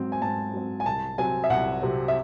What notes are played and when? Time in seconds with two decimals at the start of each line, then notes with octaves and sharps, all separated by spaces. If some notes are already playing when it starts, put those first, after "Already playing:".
Already playing: G#2 F#3 C4
0.12 G#5
0.22 G#2 A5
0.54 F#3 C4
0.80 G#5
0.86 C2 A5
1.18 C3 F#3 C4 G#5
1.44 E5
1.50 C2 F#5
1.83 C3 F#3 C4
2.08 E5